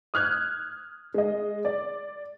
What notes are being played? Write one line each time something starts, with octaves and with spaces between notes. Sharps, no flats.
D#6 F6 F#6 G#6
G#3 D#5
D5